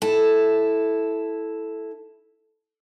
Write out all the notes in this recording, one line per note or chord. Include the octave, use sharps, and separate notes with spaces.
E4 A4